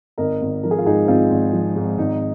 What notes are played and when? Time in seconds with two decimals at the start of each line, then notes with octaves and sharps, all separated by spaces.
0.18 G#1 A#4 D#5
0.41 G#1
0.63 F3 A#4
0.71 G#4
0.78 F4
0.85 G#2 D#4 G#4
1.07 G#1 C4 F4
1.30 G#1
1.53 F3
1.76 G#2
1.98 G#1 D#4